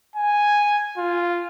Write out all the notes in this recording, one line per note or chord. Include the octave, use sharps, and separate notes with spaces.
G#5
F4